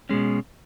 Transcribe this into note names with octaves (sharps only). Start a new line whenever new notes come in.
B2 G#3 C#4